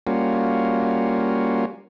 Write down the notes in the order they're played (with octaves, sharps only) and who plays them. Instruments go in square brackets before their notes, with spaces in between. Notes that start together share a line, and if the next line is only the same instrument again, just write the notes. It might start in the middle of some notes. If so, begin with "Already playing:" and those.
[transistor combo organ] G3 A#3 C#4 F4 F#4